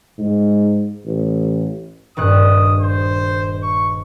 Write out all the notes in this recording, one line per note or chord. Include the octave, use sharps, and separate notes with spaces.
G#2
A1
D#1 G2 D#6 F#6
C5
C#6